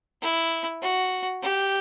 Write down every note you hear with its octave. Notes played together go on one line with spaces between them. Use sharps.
E4
F#4
G4